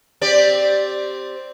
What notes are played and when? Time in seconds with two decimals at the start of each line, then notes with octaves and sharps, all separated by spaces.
0.21 C4 G4 D5